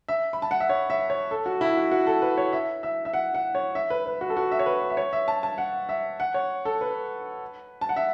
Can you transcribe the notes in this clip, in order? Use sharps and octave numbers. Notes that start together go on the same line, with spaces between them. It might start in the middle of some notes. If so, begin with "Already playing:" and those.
E5
B5
A5
F#5
E5
C#5
E5
C#5
A4
F#4
E4
F#4
F#4
A4
B4
C#5
E5
E5
E5
F#5
F#5
C#5
E5
B4
B4
F#4
A4
F#4
E5
C#5
B4
E5
C#5
E5
A5
A5
F#5
E5
F#5
C#5
A4
B4
A5
F#5
E5